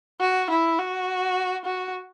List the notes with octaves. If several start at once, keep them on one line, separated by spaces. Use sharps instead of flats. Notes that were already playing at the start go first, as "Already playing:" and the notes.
F#4
E4
F#4
F#4